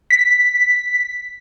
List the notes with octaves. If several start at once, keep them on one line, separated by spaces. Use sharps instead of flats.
B6